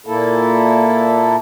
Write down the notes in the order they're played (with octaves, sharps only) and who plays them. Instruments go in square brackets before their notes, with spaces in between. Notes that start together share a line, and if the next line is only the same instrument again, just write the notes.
[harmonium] A#2 A#3 E4 A4